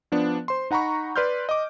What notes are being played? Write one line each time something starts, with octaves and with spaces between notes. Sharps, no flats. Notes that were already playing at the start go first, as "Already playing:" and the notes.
F3 B3 D4
C5 C6
D#4 F#5 A#5 B5 C#6
B4 D5 C6 F6 G6
D#5 D6